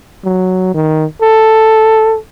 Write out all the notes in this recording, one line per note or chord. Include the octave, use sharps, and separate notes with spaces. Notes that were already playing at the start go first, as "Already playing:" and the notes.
F#3
D#3
A4